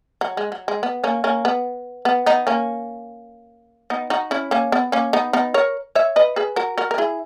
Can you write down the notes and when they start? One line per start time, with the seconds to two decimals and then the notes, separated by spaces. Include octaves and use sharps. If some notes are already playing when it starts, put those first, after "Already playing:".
0.21 F#3
0.37 G#3
0.52 F#3
0.68 G#3
0.83 B3
1.04 A#3 C#4
1.24 A#3 C#4
1.45 B3
2.05 B3
2.26 B3 D#4
2.47 A#3 C#4
3.90 B3 D#4
4.10 D#4 F#4
4.31 C#4 E4
4.51 A#3 C#4
4.72 B3
4.92 A#3 C#4
5.13 B3 D#4
5.33 B3 D#4
5.54 A#4 C#5
5.95 C#5 E5
6.16 B4 D#5
6.36 G#4 B4
6.56 F#4 A#4
6.78 F#4 A#4
6.91 A#4
6.98 E4 G#4